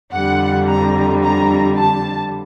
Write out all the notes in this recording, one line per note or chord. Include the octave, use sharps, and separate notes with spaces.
F2 D3 G3 F#5
A#5
A#5
A5